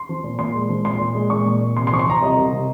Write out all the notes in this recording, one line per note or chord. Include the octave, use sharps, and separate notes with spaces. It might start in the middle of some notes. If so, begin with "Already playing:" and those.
Already playing: C6
F3
A#2
A#2 C6
G#3
F3
A#2 C6
A#2
G#3
A#2 C#6
A#2
A#2
C3 C6
C6
F3 C#6
C6
F3 A#5
C2 D#5
C2
C3